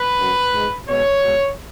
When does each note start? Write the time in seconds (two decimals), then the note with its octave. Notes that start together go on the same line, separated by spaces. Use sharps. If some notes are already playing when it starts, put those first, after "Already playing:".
Already playing: B4
0.18 F#2 F#3
0.54 G#2 G#3
0.88 B2 G#3 C#5
1.23 B2 G#3